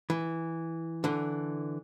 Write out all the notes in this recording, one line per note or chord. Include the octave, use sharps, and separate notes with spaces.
E3
D3 E3